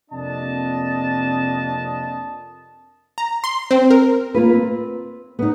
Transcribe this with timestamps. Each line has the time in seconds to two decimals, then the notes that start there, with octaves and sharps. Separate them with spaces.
0.11 F2 C3 A#3 D4 D#5 A5
3.18 A#5
3.44 C6
3.71 C4
3.91 A#4
4.34 A#3 F4 B4
4.53 C4
5.39 B3 D#4